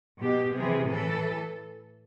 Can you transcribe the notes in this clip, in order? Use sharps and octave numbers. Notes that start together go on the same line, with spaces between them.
B2 G4
C3 E3 G#4
A2 E3 A4